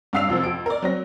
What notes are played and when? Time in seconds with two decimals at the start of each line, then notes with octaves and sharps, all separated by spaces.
0.13 G2 D4 F5 E6 C7 F7
0.28 C2 F2 C3 F3
0.44 F2 D7
0.66 A#4 D5
0.82 F#3 C4 A#6